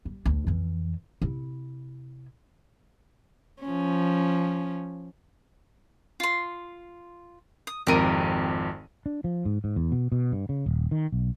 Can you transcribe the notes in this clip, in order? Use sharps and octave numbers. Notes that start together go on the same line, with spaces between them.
G3
D2
F2 E3
C3 E4
F3 C#4
F4 C6
D#6
G#1 F2 G4 A#4 D#7
D4
F3
G#2
G#2
E2
B2
B2
G2
C#3
D#1
D#3
B1